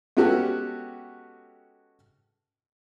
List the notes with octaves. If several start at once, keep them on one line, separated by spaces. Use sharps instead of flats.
G#3 B3 C#4 F#4 G4 A4